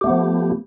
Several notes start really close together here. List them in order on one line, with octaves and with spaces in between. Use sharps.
G4 A3 B3 F3